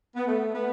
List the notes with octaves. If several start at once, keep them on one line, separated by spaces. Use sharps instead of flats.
B3
A3
B3